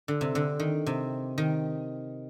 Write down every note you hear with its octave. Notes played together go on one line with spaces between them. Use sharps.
D3
C3
D3
D#3
C3
D#3